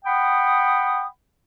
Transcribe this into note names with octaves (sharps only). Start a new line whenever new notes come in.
F#5 G5 B5 D#6